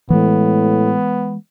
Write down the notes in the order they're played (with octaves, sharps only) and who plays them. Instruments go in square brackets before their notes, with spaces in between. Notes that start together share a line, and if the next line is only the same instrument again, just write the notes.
[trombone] A2 [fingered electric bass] E3 G#3 [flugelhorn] B3